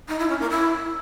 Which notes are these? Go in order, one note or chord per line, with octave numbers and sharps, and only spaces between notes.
D#4
E4
C#4
A#3
E4